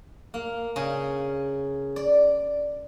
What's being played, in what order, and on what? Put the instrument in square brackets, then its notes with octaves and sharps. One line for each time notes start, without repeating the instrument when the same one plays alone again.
[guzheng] A#3
C#3
D5